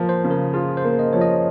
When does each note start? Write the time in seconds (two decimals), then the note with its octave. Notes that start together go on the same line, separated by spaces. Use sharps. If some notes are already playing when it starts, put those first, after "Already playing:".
Already playing: F3 A#3 F4
0.09 C5
0.24 C#3
0.31 A#4
0.53 F4 G#4
0.77 C5
0.84 A#3
0.99 D#5
1.13 F3 C#5
1.21 D#5